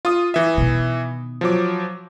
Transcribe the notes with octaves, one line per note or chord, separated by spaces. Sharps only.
F4 D#6
E3 E5
B2 D#3
F3 F#3 D6